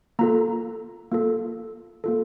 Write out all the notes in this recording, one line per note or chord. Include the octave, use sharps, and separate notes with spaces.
A#3 F4 A4 A#5
A#3 F4 A4
A#3 F4 A4